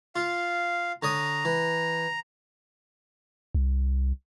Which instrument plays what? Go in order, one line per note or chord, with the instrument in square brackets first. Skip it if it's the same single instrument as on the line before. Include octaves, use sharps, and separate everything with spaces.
[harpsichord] F4 [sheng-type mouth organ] F5
[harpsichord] D3 C#5 D#6 [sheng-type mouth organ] A#5
[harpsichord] E3
[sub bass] C2